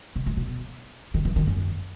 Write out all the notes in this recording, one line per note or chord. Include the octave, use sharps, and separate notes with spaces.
B2
A2
B2
D#3
E3
D#3
F#2